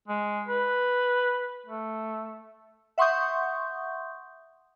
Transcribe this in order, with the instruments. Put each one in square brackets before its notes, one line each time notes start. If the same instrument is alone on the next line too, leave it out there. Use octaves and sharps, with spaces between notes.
[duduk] G#3
B4
A3
[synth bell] E5 F#5 C6 C#6 D#6 G6